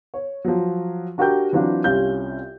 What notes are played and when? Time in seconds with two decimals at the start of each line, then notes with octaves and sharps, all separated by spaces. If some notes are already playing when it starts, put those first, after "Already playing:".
0.14 C#5
0.45 F3 F#3
1.18 D4 F#4 G4 A#4 G5 G6
1.53 E3 F#3 C4 D4 F4
1.84 C2 C3 C#4 F4 F5 G6